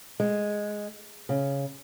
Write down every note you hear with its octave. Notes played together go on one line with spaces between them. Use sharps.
G#3
C#3